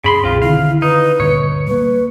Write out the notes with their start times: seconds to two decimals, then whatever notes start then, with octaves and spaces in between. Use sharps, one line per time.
0.04 F#2 C#3 G#4 B5 C6
0.24 C2 B2 C4 F4
0.42 D3 D#3 C4 E4 F5
0.82 D#4 B4
1.20 D2 G2 A#2 C#5
1.67 G3 A#3 B4